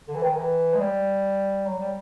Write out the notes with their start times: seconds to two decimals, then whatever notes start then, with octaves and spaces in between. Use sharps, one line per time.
0.08 D3
0.15 E3
0.23 D#3
0.37 E3
0.74 G#3
0.80 G3
1.67 F#3
1.79 G3